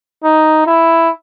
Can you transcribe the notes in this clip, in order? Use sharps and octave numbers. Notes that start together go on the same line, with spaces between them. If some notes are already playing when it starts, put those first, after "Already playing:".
D#4
E4